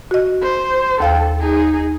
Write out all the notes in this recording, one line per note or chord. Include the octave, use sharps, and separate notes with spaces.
F#4 D#5
C5
D#2 A4 F5 G5
D#4 G#4